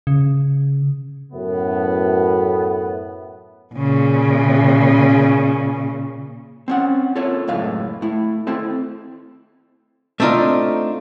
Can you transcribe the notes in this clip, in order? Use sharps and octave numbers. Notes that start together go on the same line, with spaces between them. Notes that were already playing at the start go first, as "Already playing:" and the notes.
C#3
F#2 A2 A3 B3
A#2 C#3
C4 C#4 F#5
F4 A4 C#5
C#2 F#2 A2 F5
A3 E4
C4 E4 A4
A3 C4 D4 D#4 F4